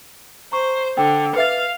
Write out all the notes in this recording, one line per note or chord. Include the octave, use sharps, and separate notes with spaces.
C5 A#5 C#6
D3 G5
B4 E5 F5 A6